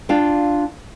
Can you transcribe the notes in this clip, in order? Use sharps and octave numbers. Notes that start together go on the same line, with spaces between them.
D4 F4 F5 G5